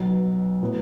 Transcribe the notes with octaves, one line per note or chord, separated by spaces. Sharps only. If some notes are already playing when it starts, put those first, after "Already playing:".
Already playing: B1 B2 F#3
A2 F#3 B3